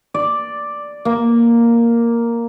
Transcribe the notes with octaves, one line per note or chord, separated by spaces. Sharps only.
D5
A#3